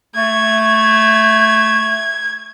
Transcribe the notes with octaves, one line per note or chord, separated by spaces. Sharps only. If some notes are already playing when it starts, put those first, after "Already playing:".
A3 G#6